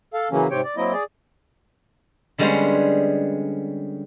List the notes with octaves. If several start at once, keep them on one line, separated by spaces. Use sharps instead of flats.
A4 F5
C#3 E3 F#3 A#3 C#4
G#2 C3 C4 G4 C#5 G5
D5
F#3 A#3 C4 E4 D#5
G#4 D5
D3 G3 G#3 B3 C#4 C5